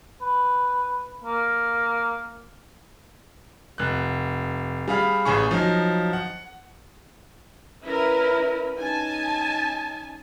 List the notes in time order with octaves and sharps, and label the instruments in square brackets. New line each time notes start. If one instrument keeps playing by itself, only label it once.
[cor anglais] B4
A#3
[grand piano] F1 F#6
G3 G#4 F5 B5
A1 G#4 C#6
F3 F#3 D#4
F#5
[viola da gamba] C#4 B4 [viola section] E4 A#4
[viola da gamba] C#4 D#4 [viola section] G#5 A5